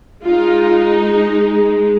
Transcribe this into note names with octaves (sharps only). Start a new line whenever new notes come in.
G#3 D#4 F4